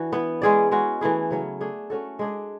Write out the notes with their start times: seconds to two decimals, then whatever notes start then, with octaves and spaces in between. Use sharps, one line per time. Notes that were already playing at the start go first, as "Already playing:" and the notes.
Already playing: E3 D4 F#4
0.13 B3 E4 B4
0.42 G#3 C#4 G#4 D5
0.71 G#3 C#4 F#4
1.01 E3 A3 E4 G#4
1.31 C#3 F#3 C#4
1.61 A3 D4 G#4
1.90 A3 C#4 F#4 A4
2.19 G#3 D4 G#4 D5